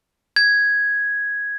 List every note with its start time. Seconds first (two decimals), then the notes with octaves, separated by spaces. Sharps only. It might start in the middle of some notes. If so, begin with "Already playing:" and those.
0.36 G#6